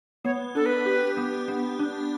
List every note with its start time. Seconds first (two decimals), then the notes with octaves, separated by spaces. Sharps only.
0.25 B3 C#5
0.55 D4 A4
0.66 B4
0.86 G4
1.17 B3
1.48 B3
1.79 D4